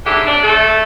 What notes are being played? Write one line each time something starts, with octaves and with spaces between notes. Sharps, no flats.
F2 G#2 D3 G4 G#4 E5
D4
A3 A4